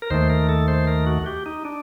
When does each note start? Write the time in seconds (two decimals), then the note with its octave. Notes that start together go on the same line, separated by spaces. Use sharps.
0.02 A#4
0.10 D#2 D#3 A3 C5
0.30 A#4
0.49 A4
0.68 C5
0.87 A#4
1.06 F#4
1.26 G4
1.46 D#4
1.65 D4